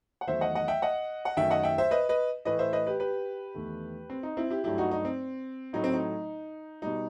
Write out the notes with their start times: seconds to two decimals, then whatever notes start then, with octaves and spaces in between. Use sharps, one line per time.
0.21 F#5
0.27 E2 D#3 F#3 A3 C5 E5
0.41 D#5 F#5
0.55 D#5 F#5
0.68 E5 G5
0.82 D#5 F#5
1.25 F#5
1.37 F#2 D#3 A3 E5 G5
1.51 D#5 F#5
1.63 E5 G5
1.78 C5 E5
1.91 B4 D#5
2.09 B4 D#5
2.45 A2 E3 A3 B4 D#5
2.59 C5 E5
2.73 B4 D#5
2.87 G4 B4
3.00 G4 B4
3.54 E2 D#3 A3
4.10 C4
4.23 D#4
4.37 C4 E4
4.50 E4 G4
4.64 G2 F#3 A3 E4 G4
4.78 D#4 F#4
4.91 D#4
5.05 C4
5.73 A2 F#3 A3 D#4
5.84 C4
5.94 D#4
6.82 B2 G3 D#4